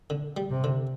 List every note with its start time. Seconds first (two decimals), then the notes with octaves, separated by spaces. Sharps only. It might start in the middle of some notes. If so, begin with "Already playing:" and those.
0.10 D3
0.37 G3
0.51 C3
0.64 D3